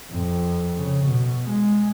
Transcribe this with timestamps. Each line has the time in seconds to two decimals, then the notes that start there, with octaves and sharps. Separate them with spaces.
0.12 F2
0.76 C#3
1.05 B2
1.45 G#3